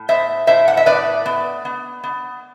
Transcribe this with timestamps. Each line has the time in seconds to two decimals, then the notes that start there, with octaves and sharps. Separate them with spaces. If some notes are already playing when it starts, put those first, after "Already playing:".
Already playing: A2
0.09 B3 C5 E5
0.47 A2 C5 E5
0.68 F#5
0.77 E5
0.86 B3 B4 D5
1.26 B3
1.65 B3
2.04 B3